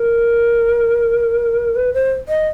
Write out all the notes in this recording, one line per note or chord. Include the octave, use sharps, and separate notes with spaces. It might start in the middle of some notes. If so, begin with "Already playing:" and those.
Already playing: A#4
B4
C5
D#5